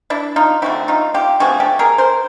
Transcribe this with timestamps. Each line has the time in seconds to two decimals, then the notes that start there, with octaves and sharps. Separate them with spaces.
0.10 D4 E4
0.36 D#4 F4
0.62 D3 F3 A3 C4 E4 F#4
0.88 D#4 F4
1.14 F4 G4
1.40 D3 F3 A3 C4 F#4 G#4
1.60 G4 A4
1.79 G#4 A#4
1.98 A#4 C5